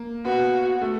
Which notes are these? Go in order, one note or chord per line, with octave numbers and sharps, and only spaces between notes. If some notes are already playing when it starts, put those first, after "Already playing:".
Already playing: A#3
B3 F#4
A3